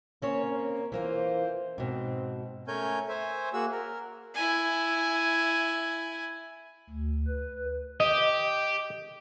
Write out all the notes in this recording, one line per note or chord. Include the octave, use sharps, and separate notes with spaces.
A#3 C4 C#4 C#5
E3 A#3 F4 C5
G#2 B2 C4
A3 C#4 A#4 C#5 G#5 G6
C5 C#5 E5 G#5
A#3 F#4 G#4 E6
A#4
E4 G#5
D2
B4
G4 D#5